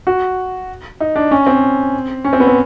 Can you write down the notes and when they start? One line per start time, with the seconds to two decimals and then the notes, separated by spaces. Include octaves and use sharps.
0.07 F#4
1.00 D#4
1.16 D4
1.31 C#4
1.47 C4
2.24 C#4
2.33 C4
2.40 B3
2.47 C4